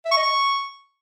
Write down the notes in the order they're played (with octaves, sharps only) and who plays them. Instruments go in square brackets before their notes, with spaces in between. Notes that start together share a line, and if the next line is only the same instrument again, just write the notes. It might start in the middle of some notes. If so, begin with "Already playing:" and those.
[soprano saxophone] E5
C#6
D#5
C#6